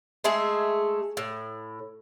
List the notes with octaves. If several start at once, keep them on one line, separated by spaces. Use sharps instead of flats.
G#3 A3 G#4 E5
A2